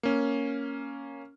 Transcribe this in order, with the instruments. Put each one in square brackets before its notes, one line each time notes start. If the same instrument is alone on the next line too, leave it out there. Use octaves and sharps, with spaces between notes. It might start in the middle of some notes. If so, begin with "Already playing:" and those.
[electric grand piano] A#3 C#4